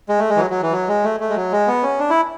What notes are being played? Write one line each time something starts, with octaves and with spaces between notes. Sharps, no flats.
G#3
A3
G#3
E3
F#3
F#3
E3
F#3
G#3
A3
A3
G#3
F#3
G#3
B3
C#4
D4
E4